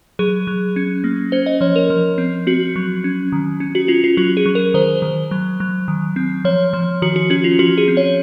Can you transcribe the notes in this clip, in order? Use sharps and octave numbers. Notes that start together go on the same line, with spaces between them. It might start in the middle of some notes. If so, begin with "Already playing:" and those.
F#3 G#4
F#3
C#4
A#3
C#4 C5
D#5
F3 C#5
A#4
F3
C4
C4 F#4
F#3
C#4
D#3
C#4
F#4
C#4 F4
F4
F#3 F#4
G#4
F#3
A#4
D#3 C5
D#3
F#3
F#3
D#3
C4
F3 C#5
F3
D#3 F#4
F#4
C#4 F#4
F4
F3 F#4
G#4
C4
C#5